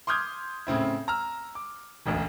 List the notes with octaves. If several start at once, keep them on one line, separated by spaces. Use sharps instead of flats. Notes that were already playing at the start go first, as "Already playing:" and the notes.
C6 D6 D#6 F6 G6 G#6
A2 C#3 C4 E4
A#5 E6 F6
D6
E1 A1 D2